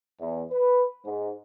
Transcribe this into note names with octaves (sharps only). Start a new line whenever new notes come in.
E2
B4
G#2